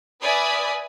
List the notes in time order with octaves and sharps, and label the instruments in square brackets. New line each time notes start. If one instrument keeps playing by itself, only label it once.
[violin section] B4 D5 E5 G#5 B5 D#6